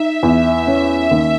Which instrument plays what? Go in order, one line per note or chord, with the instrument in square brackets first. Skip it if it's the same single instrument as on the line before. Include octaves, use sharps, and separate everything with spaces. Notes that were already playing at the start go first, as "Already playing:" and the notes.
Already playing: [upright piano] D#4 [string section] E5
[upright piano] E2
C#4
D#2